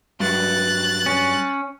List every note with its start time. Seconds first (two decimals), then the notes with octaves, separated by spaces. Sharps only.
0.20 G2 F#3 F#6 A6
1.06 C#4